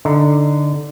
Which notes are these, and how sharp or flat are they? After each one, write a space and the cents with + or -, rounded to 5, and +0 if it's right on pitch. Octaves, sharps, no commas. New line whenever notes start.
D3 +0 D#4 -10